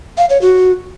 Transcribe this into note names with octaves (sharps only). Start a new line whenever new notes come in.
F5
C#5
F#4